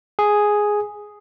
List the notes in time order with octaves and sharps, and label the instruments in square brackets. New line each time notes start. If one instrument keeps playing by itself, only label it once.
[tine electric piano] G#4